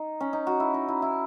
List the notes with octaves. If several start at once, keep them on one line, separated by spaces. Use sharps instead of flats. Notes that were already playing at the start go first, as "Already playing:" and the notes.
Already playing: D#4
C#4
D#4
F#4
E4
D#4
E4
E4